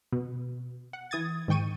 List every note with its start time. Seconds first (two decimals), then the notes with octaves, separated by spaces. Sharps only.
0.12 B2
0.93 F#5
1.11 E3 D#6 G#6 A6
1.48 G#2 D#3 G5 C#6 D#7